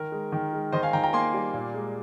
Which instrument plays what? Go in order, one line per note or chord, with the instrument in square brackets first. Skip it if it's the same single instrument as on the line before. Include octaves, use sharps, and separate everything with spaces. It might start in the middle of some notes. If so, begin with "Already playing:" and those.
Already playing: [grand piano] D#3 A#4
G#3
D#3
G#3
D#3 C5 D#5
F5 G#5
D#3 G5 A#5
G5 A#5
A#3 G#5 C6
G3
A#2
G#3